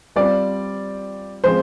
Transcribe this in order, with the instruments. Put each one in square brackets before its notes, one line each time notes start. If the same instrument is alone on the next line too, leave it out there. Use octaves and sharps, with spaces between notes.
[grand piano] G3 C4 F4 C5 [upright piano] D5
[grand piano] F3 G#3 C4 [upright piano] C5